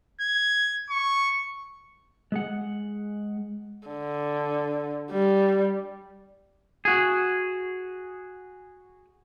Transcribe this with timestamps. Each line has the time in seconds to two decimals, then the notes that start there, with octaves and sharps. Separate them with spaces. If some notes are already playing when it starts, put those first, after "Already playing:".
0.21 G#6
0.90 C#6
2.32 G#3 G#4 F#5
3.88 D3
5.11 G3
6.85 F#4 G#4